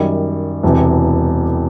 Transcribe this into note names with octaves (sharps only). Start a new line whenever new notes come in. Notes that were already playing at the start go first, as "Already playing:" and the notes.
Already playing: F#2 D#3 G3
E1 E2 C3